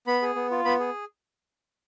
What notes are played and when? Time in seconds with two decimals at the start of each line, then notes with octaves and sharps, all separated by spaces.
0.07 B3 B5
0.22 G#4
0.35 B3
0.51 F4
0.65 B3 B5
0.80 G#4